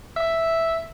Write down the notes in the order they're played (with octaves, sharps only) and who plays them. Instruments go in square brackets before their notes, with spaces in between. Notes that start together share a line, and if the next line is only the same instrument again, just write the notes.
[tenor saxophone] E5